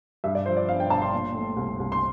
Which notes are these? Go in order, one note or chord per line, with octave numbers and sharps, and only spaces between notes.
G2 E5
D5
F3 C5
D5
G1 F5
G5
G1 A5
C6
A#2
A3
C2
C2
C6